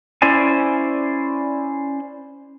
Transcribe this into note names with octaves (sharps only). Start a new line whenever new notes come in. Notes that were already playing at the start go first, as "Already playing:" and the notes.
C#4 E4 C5 D5 G#5